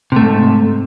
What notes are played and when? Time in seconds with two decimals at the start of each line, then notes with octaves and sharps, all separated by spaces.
0.12 C3
0.16 A3
0.21 G#2